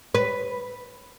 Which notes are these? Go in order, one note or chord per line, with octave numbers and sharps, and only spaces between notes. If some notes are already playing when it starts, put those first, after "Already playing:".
B4